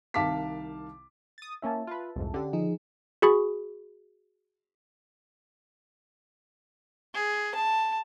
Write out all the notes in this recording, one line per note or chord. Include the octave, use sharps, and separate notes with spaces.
C2 D#3 F5 A5 D6 B6
D#6 A6
A#3 C#4 E4 E5 A5
F4 B4
C2 F2 G#2
D3 C#4 G4
F3 D#4 G#4
F#4 G#4 B5 C#6
G#4
A5